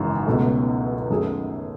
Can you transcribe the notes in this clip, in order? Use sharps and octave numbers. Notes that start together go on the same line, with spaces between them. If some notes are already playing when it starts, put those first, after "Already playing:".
Already playing: G#1 F#2 C#3 E3
C#2 B2 A3
F#2 D#3 A3 D#4 G#4